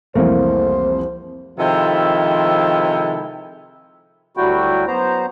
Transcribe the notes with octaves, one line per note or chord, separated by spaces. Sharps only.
C2 F2 E3 A3 A#3 C5
C3 D#3 F3 G#3 E4 A4
D2 F#3 G3 E4 F#4 G5
F#2 B3 C5 A#5